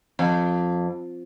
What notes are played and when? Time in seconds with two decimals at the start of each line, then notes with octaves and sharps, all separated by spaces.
0.19 F2